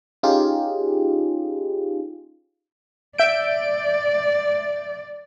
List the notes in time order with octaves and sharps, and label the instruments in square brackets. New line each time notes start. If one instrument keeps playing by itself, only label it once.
[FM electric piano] C#4 D#4 F4 G4 G#4
[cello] D5 [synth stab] E5 G6 D7